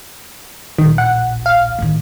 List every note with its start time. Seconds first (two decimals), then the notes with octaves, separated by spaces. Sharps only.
0.78 D1 A#1 D#3
0.98 F#5
1.46 F5
1.79 A2 D#3